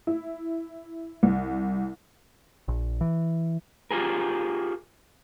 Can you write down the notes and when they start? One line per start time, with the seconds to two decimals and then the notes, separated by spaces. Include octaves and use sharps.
0.07 E4
1.23 C2
2.68 A#1
3.01 E3
3.91 F4 G4 G#4 A#4